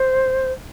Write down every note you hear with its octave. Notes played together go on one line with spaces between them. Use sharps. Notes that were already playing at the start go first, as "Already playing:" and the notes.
Already playing: C5